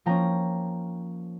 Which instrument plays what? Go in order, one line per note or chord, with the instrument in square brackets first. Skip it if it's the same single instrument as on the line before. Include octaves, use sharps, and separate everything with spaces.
[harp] F3 A#3 C#4 G5 A#5